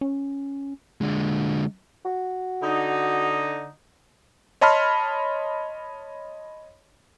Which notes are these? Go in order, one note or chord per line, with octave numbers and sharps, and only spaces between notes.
C#4
D3 G#3
F#4
D3 D#4
C#5 D#5 A5 B5 C6 F6